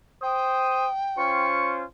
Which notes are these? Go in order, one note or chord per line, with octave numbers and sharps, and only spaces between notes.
C5 G5 D#6
C#4 F4 C5 C#6